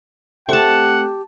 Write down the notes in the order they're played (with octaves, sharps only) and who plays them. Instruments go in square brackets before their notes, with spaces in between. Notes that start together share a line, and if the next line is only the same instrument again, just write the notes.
[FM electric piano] A3 C4 [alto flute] G4 [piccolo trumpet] F#5 [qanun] A5 C#6